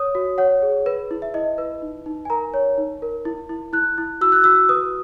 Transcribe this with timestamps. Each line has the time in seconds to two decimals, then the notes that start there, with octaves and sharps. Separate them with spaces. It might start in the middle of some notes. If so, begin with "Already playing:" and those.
Already playing: C#5 D#6
0.15 F#4
0.38 C#5 F#5
0.62 G#4
0.86 B4
1.11 E4
1.22 E5
1.34 E4 D#5
1.58 B4
1.82 D#4
2.06 D#4
2.25 G#5
2.30 A#4 A#5
2.54 C#5
2.78 D#4
3.02 A#4
3.25 E4
3.49 E4
3.73 E4 F#6
3.98 E4
4.21 F#4 E6
4.32 F#6
4.44 F#4 E6
4.69 B4 D#6